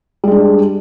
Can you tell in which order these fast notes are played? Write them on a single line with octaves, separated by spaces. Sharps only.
G3 G#3 D4